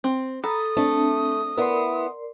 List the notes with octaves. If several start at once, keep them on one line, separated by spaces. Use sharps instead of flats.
C4
A4 A#5 B5 D#6
A3 C4 D4
B3 E4 A#4 D5 E5 C6